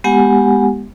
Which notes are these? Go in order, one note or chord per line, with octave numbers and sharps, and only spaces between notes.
G#3 B3 G4 F#5 G#5